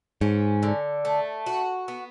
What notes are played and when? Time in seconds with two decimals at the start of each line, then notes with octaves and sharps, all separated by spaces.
0.21 G#2 C#4
0.63 D3
1.05 A3
1.46 F#4
1.88 B3